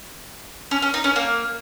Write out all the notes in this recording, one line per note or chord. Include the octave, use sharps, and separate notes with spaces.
C#4
C#4
D#4
C#4
A#3